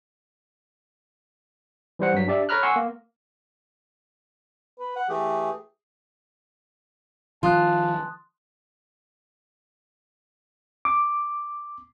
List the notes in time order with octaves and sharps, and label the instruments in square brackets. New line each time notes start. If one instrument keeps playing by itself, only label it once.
[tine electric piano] E3 G3 C5 F#5
G2 F#3 B6
D4 G4 D5 E5
A4 C#5 A#5 B5 F6 F#6
F#5 G#5 C6 C#6 E6
A#3
[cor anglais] B4
F#5
[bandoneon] E3 A3 G4 [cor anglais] G#4
[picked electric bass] D#3 F3 [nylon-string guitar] F4 [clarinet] A5 [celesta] C6 D#6 F#6
[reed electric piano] D6